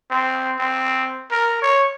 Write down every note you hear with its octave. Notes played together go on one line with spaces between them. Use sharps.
C4
C4
A#4
C#5